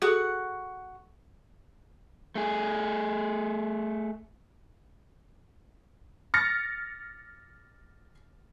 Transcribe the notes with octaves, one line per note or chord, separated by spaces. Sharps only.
F#4 G#4 A4 F#5
A3 G#4
F6 A6 A#6 C#7